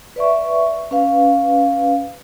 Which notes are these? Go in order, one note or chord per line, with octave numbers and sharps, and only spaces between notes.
B4 D5 E5 C#6
C#4 B4 F5